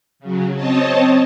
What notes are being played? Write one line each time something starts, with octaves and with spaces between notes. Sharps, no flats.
C#3 F#3
C4 C#5 D#5 A5